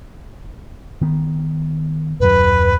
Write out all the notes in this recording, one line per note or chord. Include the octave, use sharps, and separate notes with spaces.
D#3 B3
D#1 F#2 F#3 B4